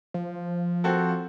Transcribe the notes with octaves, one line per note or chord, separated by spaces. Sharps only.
F3
C4 F#4 A4